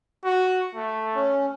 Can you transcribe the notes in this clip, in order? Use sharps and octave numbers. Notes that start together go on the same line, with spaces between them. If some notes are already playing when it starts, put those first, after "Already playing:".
F#4
A3
C#4